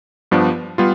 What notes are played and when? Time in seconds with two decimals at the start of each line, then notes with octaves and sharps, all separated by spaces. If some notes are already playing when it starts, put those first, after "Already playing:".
0.31 G2 F3 B3 D4
0.78 G3 B3 F4